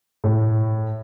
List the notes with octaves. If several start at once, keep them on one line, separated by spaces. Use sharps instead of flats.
A2